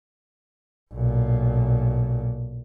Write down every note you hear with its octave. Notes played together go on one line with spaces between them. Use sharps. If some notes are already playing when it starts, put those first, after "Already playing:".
B1 A#2